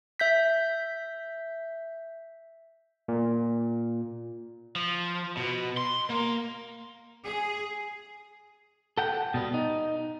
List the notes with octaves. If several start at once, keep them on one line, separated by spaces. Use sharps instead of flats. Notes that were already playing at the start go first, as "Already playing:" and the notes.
E5 G6 B6
A#2
F3
B2
C6
A#3
G#4
A4 F#5 G5
B2 G3 B3
D#4